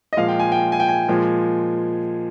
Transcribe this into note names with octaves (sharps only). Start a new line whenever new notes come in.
D#5
A#2 F3 G#3 F5
G5
G#5
G5
G#5
G5
G#5
A#2 F3 G#3